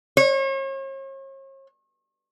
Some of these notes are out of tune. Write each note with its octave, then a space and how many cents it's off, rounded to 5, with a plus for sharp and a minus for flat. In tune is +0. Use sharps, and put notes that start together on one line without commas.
C#5 -40